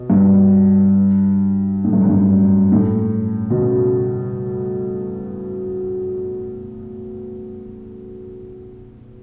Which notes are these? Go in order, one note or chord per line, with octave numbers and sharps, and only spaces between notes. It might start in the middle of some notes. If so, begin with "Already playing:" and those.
Already playing: B2
G2
A2
G2
F#2
G2
A2
B2
C#3